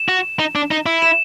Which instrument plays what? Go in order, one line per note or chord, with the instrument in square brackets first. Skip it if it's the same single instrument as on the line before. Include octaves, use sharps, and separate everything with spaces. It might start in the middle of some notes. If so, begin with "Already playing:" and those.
Already playing: [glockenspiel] E7
[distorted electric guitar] F#4
D#4
D4
D#4
E4
[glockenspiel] E7